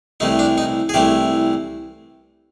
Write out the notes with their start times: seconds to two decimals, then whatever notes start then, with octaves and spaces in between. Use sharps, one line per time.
0.20 C2 C3 E3 A3 D#4
0.39 D4
0.58 D#4
0.89 G#4
0.94 C2 C3 E3 A3 G4